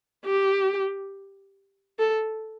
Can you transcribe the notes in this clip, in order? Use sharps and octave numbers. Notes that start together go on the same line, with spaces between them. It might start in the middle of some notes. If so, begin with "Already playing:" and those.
G4
A4